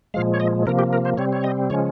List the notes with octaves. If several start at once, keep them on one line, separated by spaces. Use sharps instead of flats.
A#2 F3 G#3 F5
C#5
D#5
C3 F3 A#3 A#4
G4
A#4
C5
C3 G3 C4 C#5
C#5
D#5
C#3 F3 G#3 C#4 C#5